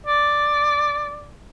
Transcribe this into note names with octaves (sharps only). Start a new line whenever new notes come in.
D5